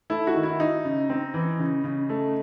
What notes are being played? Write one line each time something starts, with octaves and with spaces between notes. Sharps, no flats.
A3 E4
F#4
D#3
E4
D#4
C#3
C4
E3
C#3
C#3
A3